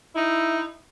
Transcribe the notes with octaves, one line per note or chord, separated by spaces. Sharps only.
D#4 E4